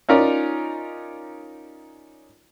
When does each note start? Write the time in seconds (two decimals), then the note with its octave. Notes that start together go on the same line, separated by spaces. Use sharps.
0.09 C#4 D#4 F4 A#4 C#5 D5